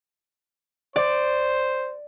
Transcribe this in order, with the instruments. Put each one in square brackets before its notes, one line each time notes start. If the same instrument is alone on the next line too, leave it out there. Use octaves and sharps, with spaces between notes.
[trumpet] C5 [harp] D5